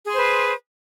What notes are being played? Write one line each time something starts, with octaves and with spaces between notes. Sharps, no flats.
G#4 B4 C5 C6